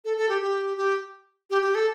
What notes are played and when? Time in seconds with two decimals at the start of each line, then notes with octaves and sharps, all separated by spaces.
0.05 A4
0.17 A4
0.29 G4
0.41 G4
0.77 G4
1.50 G4
1.62 G4
1.75 A4